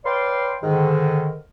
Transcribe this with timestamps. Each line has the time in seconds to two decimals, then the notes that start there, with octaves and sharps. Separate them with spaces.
0.05 B4 C#5 D5 F5 G5 C6
0.63 G#2 D3 D#3